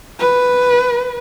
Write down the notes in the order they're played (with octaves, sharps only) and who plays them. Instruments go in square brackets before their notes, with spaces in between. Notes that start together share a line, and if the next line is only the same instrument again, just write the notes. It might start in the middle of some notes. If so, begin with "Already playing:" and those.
[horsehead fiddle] B4